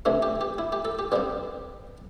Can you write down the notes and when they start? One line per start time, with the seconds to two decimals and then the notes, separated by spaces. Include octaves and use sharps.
0.05 C3 E3 A3 D4 E4
0.22 G4
0.41 G4
0.58 E4
0.72 G4
0.85 A4
0.99 G4
1.12 G2 D3 G3 C4 G4